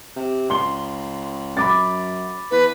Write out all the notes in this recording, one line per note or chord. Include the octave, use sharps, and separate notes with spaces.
C3
C#2 C6 G7
F#2 B5 D6 A6
E2 B4